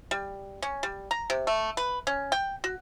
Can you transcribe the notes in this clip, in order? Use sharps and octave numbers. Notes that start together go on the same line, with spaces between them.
G3
C#4
G3
A#5
C3
A3
B4
C#4
G5
F#4